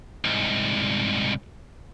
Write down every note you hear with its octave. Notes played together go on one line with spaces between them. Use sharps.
C2 G#2